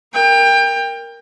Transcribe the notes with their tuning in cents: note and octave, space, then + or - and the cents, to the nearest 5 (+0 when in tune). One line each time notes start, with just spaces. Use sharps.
A#4 +0 G5 +25